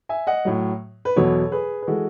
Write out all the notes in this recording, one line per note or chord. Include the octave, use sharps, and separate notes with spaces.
E5 G#5
D#5 F#5
A2 F#3
B4
E2 B2 F#3 A4 C#5
G#4 B4
B4
E3 G#3 F#4 A4